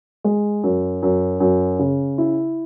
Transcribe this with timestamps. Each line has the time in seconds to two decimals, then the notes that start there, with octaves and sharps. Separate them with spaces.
0.24 G#3
0.63 F#2
1.03 F#2
1.40 F#2
1.79 C#3
2.18 E4